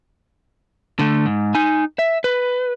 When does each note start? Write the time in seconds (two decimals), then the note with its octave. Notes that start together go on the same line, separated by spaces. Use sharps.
0.99 D3 A3
1.26 G#2
1.55 D#4 G#5
1.99 E5
2.24 B4